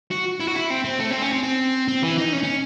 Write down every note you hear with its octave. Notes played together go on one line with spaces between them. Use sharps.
F#4
E4
F#4
E4
C4
C4
A3
C4
C#4
C4
C4
C4
E3
D#4
C#4
C#4